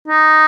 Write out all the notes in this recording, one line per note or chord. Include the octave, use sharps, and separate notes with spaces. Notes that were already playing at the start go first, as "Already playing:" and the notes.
D#4